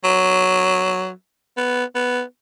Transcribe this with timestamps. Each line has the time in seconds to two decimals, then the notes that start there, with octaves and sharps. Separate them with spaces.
0.04 F#3
1.57 B3
1.95 B3